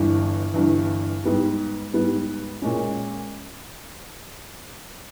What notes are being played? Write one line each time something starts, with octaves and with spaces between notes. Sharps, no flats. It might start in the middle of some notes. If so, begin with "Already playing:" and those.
Already playing: G1 G2 E3
G1 G2 E3
G#2 G3 B3 G4
G#2 G3 B3 G4
A#2 G#3 C#4